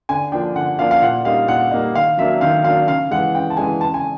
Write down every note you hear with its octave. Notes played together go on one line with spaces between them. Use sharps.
D3 G#5
F3 A#3 D4 G5
D3 F#5
F3 A#3 D4 F5
F5
A#2 F#5
G3 A#3 D#4 F5
A#2 F#5
G3 A#3 D#4
D#3 F5
F#3 A#3 D4 E5
D#3 F5
F#3 A#3 D4 F5
C#3 F5
E3 G#3 F#5
C#3 G5
A5
E3 G#3 G#5
C#3 A5
G#5